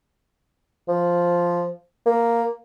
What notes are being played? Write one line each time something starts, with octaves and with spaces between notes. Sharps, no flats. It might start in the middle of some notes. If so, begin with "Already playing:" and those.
F3
A#3